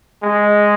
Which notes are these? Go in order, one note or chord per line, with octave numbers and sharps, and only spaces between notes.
G#3